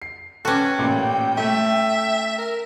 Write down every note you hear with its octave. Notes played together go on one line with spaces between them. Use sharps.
C7
C#4 F#4 A4 B4 G5 D6
A1 A#2
A3 E5
A#4